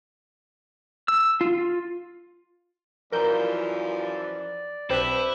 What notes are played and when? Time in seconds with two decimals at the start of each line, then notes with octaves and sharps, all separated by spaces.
1.08 E6
1.41 F4
1.58 F4
3.12 F#2 E3 F3 A#4 D5 G6
4.90 B1 C4 D4 E4 G4 B4